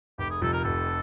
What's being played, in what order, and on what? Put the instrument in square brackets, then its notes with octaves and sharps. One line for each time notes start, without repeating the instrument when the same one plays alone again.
[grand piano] F1 [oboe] G4
[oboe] G#4
[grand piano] F2 C3 F3 [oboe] A4
[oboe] A#4
[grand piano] F1 [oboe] A4